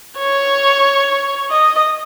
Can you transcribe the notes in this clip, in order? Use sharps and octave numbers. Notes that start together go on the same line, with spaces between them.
C#5
D#5